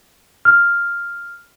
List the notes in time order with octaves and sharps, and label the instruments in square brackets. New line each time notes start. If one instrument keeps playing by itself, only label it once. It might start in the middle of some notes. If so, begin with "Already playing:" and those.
[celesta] F6